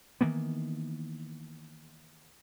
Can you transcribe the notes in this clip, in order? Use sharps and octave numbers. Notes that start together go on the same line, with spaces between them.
D#3 E3 A#3 B3